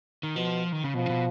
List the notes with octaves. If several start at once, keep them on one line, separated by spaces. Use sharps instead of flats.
D#3
B2 F3
D#3
C#3
B2 F3
C#3
B2